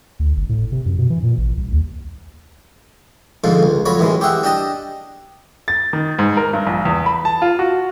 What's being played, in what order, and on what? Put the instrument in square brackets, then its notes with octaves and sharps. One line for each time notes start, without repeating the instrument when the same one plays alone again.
[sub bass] D2
G1
A2
C3
F#2
B2
E3
A#2
A1
C2
D#2
[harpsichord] F2 G#2 D3 F3
C#2
F2 F#3 C#5 B5
A1 F#2 E3 G#3
G4 G#4 E5 F#5
D4 G4 D#5 A5
[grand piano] A6
D#3
G#2
A#4
G2
A#1
E2
B5
A5
F4
F#4